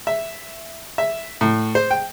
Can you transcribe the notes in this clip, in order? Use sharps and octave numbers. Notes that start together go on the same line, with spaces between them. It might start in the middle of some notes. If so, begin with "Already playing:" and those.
E5
E5
A2
C5
G5